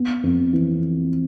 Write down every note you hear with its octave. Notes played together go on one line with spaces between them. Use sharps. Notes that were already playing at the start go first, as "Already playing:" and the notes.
Already playing: B3
F2
E3